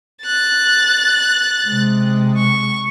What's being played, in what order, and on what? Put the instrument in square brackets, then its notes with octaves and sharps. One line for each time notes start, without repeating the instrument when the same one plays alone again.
[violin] F#6 A6
[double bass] C3 G#3
[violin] C#6